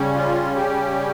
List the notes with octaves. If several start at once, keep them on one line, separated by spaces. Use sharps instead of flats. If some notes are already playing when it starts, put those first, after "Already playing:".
Already playing: C#3 G3 C#4
F4
G4